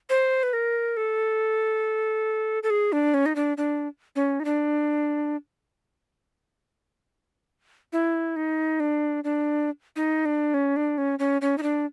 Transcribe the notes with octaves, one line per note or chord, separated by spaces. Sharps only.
C5
B4
A#4
A4
A4
G#4
D4
C#4
D#4
D4
D4
C#4
D#4
D4
E4
D#4
D4
D4
D#4
D4
C#4
D4
C#4
C#4
C#4
D#4
D4